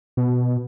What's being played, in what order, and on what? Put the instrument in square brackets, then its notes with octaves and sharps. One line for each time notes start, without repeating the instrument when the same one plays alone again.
[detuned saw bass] B2